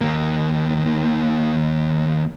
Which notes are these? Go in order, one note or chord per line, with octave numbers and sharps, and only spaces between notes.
D#2 A#3